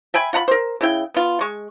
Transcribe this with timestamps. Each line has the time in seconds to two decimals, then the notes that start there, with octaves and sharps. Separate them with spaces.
0.14 E5 G5 G#5 B5
0.33 F4 F#5 A#5 B5
0.48 A#4 C5
0.81 C#3 E4 G5
1.14 B3 F4
1.41 G#3 C#6